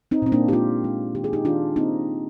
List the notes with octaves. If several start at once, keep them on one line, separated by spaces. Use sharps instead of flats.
C4 D#4
A#2 C4
A#3 D4
G4
G#3 D4 F4
G#3
D#3 G4
G#4
D#4 G4
D#3 D4 F4
A#3 C4 D#4